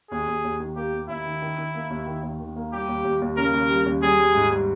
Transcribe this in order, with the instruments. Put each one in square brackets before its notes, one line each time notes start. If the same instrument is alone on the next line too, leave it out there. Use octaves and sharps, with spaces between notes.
[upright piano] D#2 [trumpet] G#4
[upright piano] D#2
D#2
D#3
[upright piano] A#3 [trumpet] G4
[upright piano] A#3
[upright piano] D#2 [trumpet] E4
[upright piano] D#3
D#3
D#3
A#3
D#2
D#3
D#2
D#3
A#3
[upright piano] G3 [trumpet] G4
[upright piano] D#2
D#2
D#2
[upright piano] C#3 [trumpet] A#4
[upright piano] D#2
G3
D#2
[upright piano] G3 [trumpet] G#4
[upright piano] G3
G#2
G3